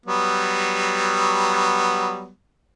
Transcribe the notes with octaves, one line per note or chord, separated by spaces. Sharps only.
F#3 G3 B3